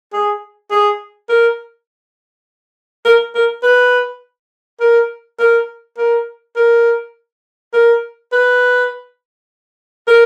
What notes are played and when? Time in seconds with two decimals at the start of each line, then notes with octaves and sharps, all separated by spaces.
0.13 G#4
0.71 G#4
1.29 A#4
3.05 A#4
3.35 A#4
3.63 B4
4.80 A#4
5.39 A#4
5.98 A#4
6.56 A#4
7.73 A#4
8.32 B4
10.07 A#4